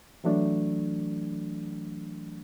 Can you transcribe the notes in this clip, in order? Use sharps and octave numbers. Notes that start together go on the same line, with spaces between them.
E3 F#3 A3 D4